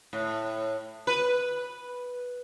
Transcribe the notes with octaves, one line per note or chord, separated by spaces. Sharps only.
A2
B4